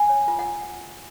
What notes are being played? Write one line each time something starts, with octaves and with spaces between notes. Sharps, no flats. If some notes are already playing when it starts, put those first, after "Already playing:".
Already playing: F#5 G#5
C#5
F4
F#5